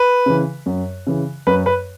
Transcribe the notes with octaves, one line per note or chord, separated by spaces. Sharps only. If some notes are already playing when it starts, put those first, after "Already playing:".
Already playing: B4
C#3 E3
F#2
C#3 E3
F#2 B4
B4